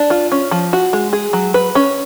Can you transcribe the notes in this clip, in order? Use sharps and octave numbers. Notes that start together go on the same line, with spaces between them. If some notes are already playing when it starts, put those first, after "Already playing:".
Already playing: D4
F4
C#4
F3
F#4
G#3
G#4
F#3
B4
C#4